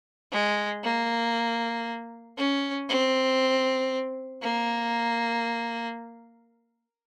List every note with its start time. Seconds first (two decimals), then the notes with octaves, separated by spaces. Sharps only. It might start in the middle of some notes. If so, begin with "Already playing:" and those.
0.32 G#3
0.83 A#3
2.37 C#4
2.89 C4
4.42 A#3